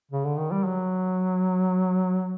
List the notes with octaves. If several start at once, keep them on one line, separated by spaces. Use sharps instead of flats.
C#3
D3
D#3
G3
F#3